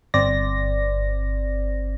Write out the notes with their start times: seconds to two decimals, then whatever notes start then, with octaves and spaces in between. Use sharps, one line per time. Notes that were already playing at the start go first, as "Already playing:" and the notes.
0.14 G1 C4 C5 D5 A#6